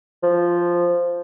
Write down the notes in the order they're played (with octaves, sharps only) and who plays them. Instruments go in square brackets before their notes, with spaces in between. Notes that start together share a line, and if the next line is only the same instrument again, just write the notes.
[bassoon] F3